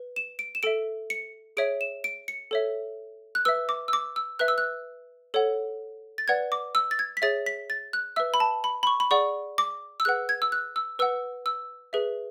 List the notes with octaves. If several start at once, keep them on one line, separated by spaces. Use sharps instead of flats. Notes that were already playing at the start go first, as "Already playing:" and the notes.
Already playing: B4
E7
D7
E7
A4 E5 D7
C#7
G#4 C#5 E5 D7
E7
D7
C#7
A4 C#5 E5
F#6
B4 E5 E6
D6
E6
D6
E6
B4 E5 F#6
E6
F#6
A4 C#5 F#5
A6
B4 D5 F#5 G#6
D6
E6
A6
G#6
B6
G#4 C#5 E5 A6
B6
A6
F#6
B4 E5 E6
B5
A5
B5
B5
C#6
B5
G#4 D5 F#5 C#6
D6
E6
G#4 B4 F#5 F#6
G#6
E6
F#6
E6
B4 F#5 E6
E6
G#4 B4 E5